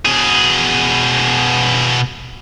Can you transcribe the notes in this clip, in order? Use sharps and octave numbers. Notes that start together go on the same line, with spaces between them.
B2 G#4